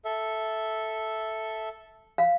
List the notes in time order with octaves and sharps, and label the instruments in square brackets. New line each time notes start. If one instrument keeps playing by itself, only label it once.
[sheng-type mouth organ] A4 E5
[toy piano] F5